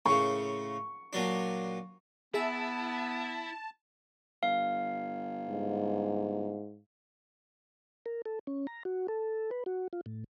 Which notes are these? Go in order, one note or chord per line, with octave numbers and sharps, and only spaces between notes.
A2 C#3 C#6
A#2 F#3 D4
B3 E4 G#4 E5 A5
G1 F5
G#2
A#4
A4
C#4
A#5
F#4
A4
B4
F#4
F4
A2